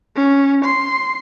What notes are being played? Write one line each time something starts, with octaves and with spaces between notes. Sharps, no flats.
C#4
C6